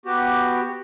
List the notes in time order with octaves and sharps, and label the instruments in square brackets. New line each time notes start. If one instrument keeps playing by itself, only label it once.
[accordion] B3 F#4 G4